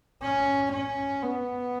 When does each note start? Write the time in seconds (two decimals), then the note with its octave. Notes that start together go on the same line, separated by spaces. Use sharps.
0.23 C#4
0.73 C#4
1.23 B3